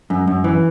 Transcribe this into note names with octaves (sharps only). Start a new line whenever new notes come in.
F#2
F#2
E3